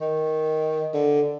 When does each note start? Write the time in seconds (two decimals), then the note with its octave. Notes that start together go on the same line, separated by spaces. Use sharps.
0.01 D#3
0.94 D3